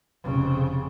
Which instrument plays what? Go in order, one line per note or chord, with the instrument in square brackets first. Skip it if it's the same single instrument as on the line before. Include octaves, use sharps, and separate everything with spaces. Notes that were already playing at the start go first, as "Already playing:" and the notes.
[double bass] F1 C#3